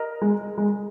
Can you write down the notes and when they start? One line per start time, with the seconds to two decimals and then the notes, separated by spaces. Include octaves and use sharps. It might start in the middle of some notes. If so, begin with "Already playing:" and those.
Already playing: A#4 D#5 A#5
0.22 G#3
0.58 G#3